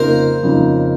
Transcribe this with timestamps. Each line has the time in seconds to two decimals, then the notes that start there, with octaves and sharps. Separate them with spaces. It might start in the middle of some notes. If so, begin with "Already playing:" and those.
Already playing: F2 C#3 F3 A#3 D#4 A#4 C5
0.43 F2 C#3 F3 A#3 D#4